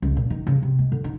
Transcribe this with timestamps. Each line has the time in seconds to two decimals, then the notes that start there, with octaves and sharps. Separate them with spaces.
0.02 C#2
0.17 A#2
0.30 D#3
0.47 C#3
0.62 C3
0.79 G#3
0.92 D3
1.04 D#4